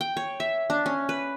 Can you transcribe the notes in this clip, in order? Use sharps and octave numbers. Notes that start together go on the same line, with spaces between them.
G5
C#5
E5
D4
C#4
B4